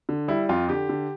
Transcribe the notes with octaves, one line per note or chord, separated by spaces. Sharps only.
D3
G3 E4
F2 F4
D3 G4
D3